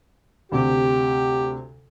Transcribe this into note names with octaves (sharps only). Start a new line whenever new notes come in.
D2 C3 G4